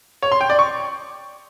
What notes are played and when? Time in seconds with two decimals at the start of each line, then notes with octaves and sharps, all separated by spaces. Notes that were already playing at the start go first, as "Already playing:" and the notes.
0.22 C#5
0.32 C6
0.41 G5
0.50 D5
0.59 C#6